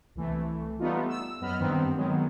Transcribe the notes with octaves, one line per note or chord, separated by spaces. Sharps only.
C2 E3 A3
G3 A3 B3 D#4 F4
E6
F#2 B3 D#5 B5 F6
G2 D#3 B3 C4
D#3 F#3 G#3 B3